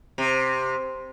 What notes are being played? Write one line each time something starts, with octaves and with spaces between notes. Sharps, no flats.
C3